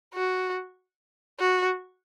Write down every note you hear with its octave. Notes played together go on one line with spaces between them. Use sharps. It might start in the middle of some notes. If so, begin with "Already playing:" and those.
F#4
F#4